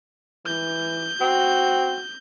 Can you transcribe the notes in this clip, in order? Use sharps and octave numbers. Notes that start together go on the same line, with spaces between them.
E3 G6
C4 F#4